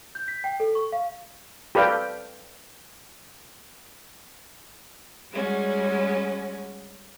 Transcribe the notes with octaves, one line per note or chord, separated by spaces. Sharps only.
G6
B6
G5
A4
C#6
F5
G4 A4 B4 D5 F5 G5
G3 G#3 C#4 F#4